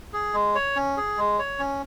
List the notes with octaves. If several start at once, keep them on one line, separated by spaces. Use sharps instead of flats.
G#4
G#3
C#5
C#4
G#4
G#3
C#5
C#4